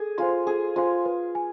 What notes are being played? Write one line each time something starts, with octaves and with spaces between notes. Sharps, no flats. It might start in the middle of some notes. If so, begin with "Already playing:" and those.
Already playing: G#4 A4
F4 C5 G#5 C6
G#4 A4
F4 C5 G#5 C6
B4
G#5